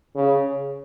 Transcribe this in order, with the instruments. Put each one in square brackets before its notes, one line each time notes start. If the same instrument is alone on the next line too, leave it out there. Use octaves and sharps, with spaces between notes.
[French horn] C#3